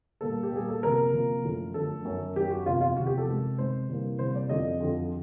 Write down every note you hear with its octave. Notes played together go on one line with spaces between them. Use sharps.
A#2 G3 A#3 A4
G4
A#2 G3 A#3 G#4
A4
C3 F3 A#3 A#4
C3 F3 A#3
F#2 D3 F3 A3
F#2 D3 F3 A3 A4
F#2 D#3 F#3
F#2 D#3 F#3 G4
F#4
E2 C3 F3 F4
F4
E2 C3 F3 F#4
G4
A4
C3 D#3 G#3
C3 D#3 G#3 C5
C3 E3 G3 A#3
C3 E3 G3 A#3 C5
D5
F2 D3 F3 D#5
F2 D3 F3